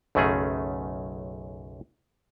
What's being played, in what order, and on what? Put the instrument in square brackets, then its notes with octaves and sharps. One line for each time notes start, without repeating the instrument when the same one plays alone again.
[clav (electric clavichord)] B1 F#2 C#3 A3 C#4 G#4